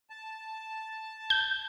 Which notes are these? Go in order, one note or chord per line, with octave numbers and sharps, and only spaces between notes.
A5
G6